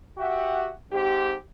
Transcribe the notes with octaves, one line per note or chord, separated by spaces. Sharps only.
F#4 G4 E5 F#5 G5
G#2 C4 G4